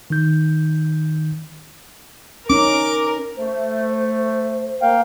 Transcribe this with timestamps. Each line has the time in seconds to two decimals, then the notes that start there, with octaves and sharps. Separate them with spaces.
0.10 D#3 D#4 G6
2.50 C#4 D#4 A#4 D6
3.37 A3 C5
4.82 A#3 F5 G5